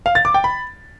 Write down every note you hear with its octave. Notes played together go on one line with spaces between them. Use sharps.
F5
A6
D6
G5
B5